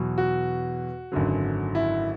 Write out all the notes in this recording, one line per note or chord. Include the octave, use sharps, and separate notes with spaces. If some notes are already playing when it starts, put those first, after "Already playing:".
Already playing: E2 B2 F#3
F#4
G#1 F#2 D3 F#3
E4